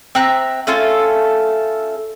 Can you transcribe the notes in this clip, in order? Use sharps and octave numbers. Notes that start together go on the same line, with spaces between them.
C4 E5 A#5 F#6
A3 C#4 F4 A4